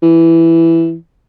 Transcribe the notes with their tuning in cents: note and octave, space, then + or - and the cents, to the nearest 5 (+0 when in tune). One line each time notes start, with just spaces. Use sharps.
E3 +5